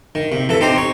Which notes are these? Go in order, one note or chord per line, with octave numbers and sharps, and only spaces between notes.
D#3
C3
E3 A4
C4 D#4 G4 C5
C#5